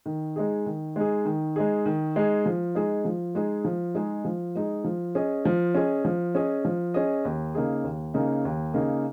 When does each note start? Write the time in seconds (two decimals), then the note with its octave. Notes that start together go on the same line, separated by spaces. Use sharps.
0.06 D#3
0.36 G#3 D#4 G#4
0.66 D#3
0.96 G#3 D#4 G#4
1.25 D#3
1.56 G#3 D#4 G#4
1.86 D#3
2.16 G#3 D#4 G#4
2.46 F3
2.75 G#3 D#4 G#4
3.05 F3
3.35 G#3 D#4 G#4
3.65 F3
3.95 G#3 D#4 G#4
4.25 F3
4.55 G#3 D#4 G#4
4.84 F3
5.15 C#4 G#4 D#5
5.45 F3
5.75 C#4 G#4 D#5
6.05 F3
6.35 C#4 G#4 D#5
6.65 F3
6.94 C#4 G#4 D#5
7.25 D#2
7.55 C#3 A#3 D#4 G#4
7.84 D#2
8.14 C#3 A#3 D#4 G#4
8.45 D#2
8.74 C#3 A#3 D#4 G#4